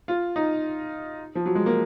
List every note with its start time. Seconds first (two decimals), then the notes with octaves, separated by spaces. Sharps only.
0.08 F4
0.36 D#4
1.35 F3
1.46 F#3
1.55 G#3
1.66 A#3